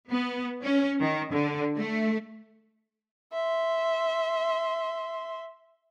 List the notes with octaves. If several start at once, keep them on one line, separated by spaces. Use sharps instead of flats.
B3
C#4
D#3
D3
A3
E5 C6